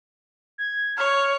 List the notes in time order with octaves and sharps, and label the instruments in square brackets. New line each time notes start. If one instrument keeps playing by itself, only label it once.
[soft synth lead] G#6
[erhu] C#5 [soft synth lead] F6